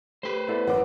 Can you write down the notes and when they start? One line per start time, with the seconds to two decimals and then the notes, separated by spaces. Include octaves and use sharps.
0.23 A3 G4 B4 C5
0.48 B3 E4 A4 D5
0.67 G#1 F#2 D#3 E3 F#5 D6